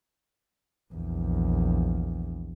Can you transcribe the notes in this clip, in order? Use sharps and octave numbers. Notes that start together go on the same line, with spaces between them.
A#1 E2